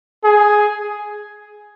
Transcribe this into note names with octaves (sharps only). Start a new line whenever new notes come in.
G#4